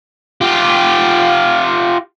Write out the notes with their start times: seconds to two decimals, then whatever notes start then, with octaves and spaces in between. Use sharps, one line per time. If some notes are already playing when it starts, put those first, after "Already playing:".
0.41 F4 G4